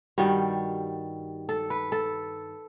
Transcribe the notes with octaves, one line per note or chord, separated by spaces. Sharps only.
G2 D#3 G3 F#4
A4
B4
A4